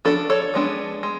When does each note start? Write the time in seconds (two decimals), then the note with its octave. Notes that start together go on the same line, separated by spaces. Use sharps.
0.05 F3 B3 D4 F#4 A4
0.30 A4 C#5
0.54 F3 G#3 B3 D4
1.03 G#3